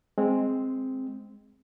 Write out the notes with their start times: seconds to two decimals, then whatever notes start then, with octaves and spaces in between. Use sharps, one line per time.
0.18 G#3 C4